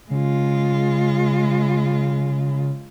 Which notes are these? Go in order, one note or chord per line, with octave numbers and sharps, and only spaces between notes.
C#3 G#3 F4